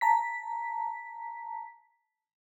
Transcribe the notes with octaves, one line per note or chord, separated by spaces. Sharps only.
A5 A#5 B6